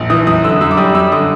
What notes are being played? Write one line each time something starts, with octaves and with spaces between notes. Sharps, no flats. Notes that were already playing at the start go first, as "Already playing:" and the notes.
Already playing: A#1
E3 D#6
F#2 D#6
D3 E6
F#2 E6
D6
G3 D#6
F#2 E6
D3 D#6